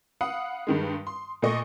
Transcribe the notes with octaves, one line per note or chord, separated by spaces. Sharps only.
F5 F#5 B5 D#6
G2 D#3 G#3
C6
A#2 A3 D#5 C#6